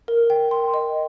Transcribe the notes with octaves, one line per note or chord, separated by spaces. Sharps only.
A#4
G5
C6
D#5